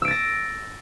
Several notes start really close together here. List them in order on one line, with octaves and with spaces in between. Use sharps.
E6 D7 A6 A#6